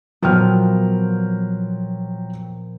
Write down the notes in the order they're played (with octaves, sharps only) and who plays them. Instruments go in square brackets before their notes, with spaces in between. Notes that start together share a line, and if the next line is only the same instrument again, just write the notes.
[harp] A#2 F3 B3 [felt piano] F#3 G5 F6